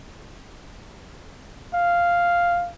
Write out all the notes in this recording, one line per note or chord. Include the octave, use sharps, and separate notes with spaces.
F5